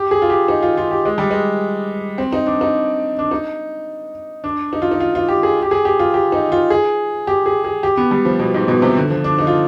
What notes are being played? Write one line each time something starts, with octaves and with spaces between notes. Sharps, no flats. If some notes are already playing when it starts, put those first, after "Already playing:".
Already playing: G4
G#4
F4
G4
D#4
F4
F4
G4
G#3
G3
G#3
C4
D#4
D4
D#4
D4
D#4
D4
D#4
F4
D#4
F4
F4
G4
G#4
G4
G#4
G4
F4
G4
D#4
F4
G#4
G4
G#4
G#4
G4
B3
G3
F3
B2
G#2
B2
C3
D3
F3
D4
D#4
F4